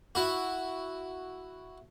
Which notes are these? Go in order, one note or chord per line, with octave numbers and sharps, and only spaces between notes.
E4 F#4